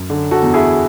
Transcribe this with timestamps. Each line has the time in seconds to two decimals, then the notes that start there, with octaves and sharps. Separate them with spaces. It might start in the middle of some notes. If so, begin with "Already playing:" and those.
Already playing: F#2
0.10 D3
0.31 F#4 A4
0.42 E2
0.54 E4 G#4